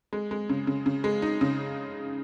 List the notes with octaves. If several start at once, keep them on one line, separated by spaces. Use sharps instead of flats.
G#3
G#3
C#3
C#3
C#3
G#3
D#4
C#3